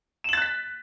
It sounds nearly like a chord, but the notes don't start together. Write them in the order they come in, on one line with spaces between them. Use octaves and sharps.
E7 F#7 A6 F#6 B6